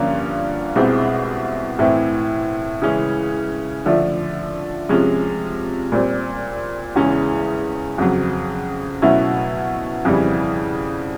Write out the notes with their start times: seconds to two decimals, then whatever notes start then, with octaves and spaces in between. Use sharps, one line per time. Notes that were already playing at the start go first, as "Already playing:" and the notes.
Already playing: G2 D3 F3 A#3 C#4
0.75 C2 B2 G#3 C4 E4
1.79 A2 E3 A3 C4
2.82 C#3 E3 G#3 C#4
3.86 D3 F3 A3
4.89 C3 F3 G#3 C#4
5.92 A#2 G3 C4
6.96 E2 C#3 E3 G#3 C#4
7.98 F2 C#3 F#3
9.02 B2 F#3 A3 C#4 E4
10.05 F2 C#3 E3 G3